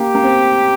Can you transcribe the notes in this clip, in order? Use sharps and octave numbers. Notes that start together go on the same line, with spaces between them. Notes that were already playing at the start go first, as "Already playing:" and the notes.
Already playing: A#3 G4
A#3
C4